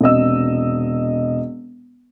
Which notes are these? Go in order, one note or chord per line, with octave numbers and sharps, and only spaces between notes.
E1 C3 D#5 E6